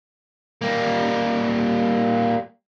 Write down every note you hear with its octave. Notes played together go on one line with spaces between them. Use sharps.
G3 A#3